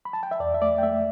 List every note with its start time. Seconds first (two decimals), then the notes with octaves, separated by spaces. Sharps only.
0.05 B5
0.13 A5
0.23 G5
0.31 E5
0.40 E2 D5
0.54 E5
0.62 A3 D5
0.78 G5
0.83 A3 E5